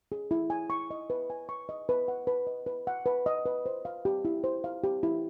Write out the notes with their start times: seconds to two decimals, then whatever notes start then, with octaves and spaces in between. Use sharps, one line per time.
0.12 G#4
0.31 E4
0.50 G#5
0.70 C#6
0.91 D#5
1.10 B4
1.30 G#5
1.49 C#6
1.69 D#5
1.89 B4
2.08 F#5
2.27 B4
2.47 D#5
2.66 B4
2.87 F#5
3.06 B4
3.26 D#5
3.46 B4
3.66 C5
3.85 F5
4.05 G4
4.25 E4
4.44 C5
4.64 F5
4.84 G4
5.03 E4